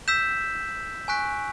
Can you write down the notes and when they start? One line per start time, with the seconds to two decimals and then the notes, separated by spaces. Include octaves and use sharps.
0.08 E6 G6 B6 E7
1.08 G#5 C#6 F#6 B6 D7